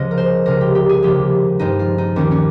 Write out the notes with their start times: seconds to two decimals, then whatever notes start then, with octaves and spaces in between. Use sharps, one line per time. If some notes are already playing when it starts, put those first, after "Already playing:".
Already playing: C#2 C#3 F3 G#3 D#5
0.11 A#4
0.17 C5
0.46 C#2 C#3 G#3 A#4
0.61 G4
0.75 G4
0.89 G#4
1.02 D#2 C#3 F3 G#3 G4
1.59 G2 F3 G#3 D#4
1.79 F4
1.98 D#4
2.16 D#2 D#3 G3 C#4
2.31 C#4